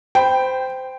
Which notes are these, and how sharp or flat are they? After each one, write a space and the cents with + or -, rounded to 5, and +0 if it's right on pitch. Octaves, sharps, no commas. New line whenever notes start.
C5 -20 G5 +0 B5 +0